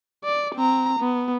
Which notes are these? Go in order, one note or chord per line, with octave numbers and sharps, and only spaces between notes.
D5
C4 A#5
B3